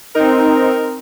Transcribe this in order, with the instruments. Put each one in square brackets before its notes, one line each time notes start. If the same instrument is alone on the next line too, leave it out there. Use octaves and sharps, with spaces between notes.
[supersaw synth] C4 D#4 [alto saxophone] A#4